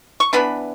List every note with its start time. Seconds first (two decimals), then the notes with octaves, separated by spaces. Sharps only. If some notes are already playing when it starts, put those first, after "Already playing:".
0.20 C#6
0.33 E3 B3 D4 B5